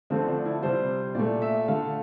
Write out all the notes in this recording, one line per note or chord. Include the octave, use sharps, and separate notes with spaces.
D3 F3 A3 C4
D4
E4
C3 G3 C5
A#2 A3 D5
E5
D3 A3 F5